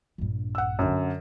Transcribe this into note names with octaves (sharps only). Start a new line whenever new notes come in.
A#1 G2
F#5 E6
F#2 D3